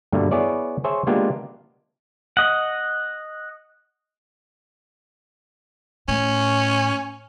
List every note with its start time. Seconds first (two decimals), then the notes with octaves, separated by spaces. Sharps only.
0.12 G2 B2 D3 G3 A3 A#3
0.31 B3 E4 G#4 C#5 D5 A5
0.84 G#4 C5 C#5 E5 A5
1.07 G#3 A#3 B3 D4 F4 G4
2.37 D#5 F#5
6.08 A2 C#4